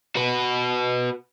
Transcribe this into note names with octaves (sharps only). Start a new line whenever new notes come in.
F#4 B4